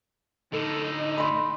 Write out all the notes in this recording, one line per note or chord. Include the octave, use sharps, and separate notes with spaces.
A2 D3 D#4 A4
B5 C6